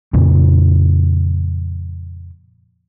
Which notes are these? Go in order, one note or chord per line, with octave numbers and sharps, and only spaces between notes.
F2 A#2 C#3